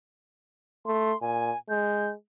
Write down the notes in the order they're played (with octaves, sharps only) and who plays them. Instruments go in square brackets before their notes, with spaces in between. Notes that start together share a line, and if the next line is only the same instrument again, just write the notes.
[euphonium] A3 [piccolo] C6
[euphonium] A#2 [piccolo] G#5
[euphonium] G#3 [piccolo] G6